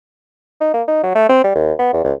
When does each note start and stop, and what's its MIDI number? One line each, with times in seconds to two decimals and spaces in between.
0.61 0.70 63
0.74 0.83 58
0.88 1.02 63
1.03 1.13 54
1.15 1.26 57
1.29 1.43 60
1.44 1.52 55
1.55 1.73 39
1.79 1.91 59
1.93 2.01 40
2.04 2.13 37